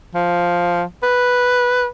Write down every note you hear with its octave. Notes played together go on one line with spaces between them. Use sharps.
F3
B4